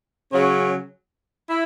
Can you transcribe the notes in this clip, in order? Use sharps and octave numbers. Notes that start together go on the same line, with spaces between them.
C#3 F#3 C#4
E4